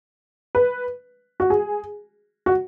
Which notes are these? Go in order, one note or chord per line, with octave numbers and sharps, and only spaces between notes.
B4
F#4
G#4
F#4